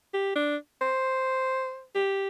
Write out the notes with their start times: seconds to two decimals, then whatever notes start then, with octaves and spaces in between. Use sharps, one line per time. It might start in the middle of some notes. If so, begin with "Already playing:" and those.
0.14 G4
0.36 D4
0.81 C5
1.95 G4